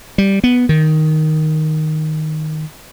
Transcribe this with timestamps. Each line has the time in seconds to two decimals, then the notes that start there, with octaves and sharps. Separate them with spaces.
0.18 G3
0.44 B3
0.69 D#3